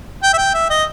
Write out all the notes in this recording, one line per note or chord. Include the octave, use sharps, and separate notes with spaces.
G5
E5
G5
E5
D#5